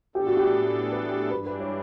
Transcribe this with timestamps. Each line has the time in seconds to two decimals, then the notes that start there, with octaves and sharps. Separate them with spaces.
0.15 A2 E3 B3 D4 G4 A4
0.27 F#4
0.37 G4
0.92 B4
1.11 G4
1.31 G2 E3 G3 D4 B4
1.46 B4
1.60 C#5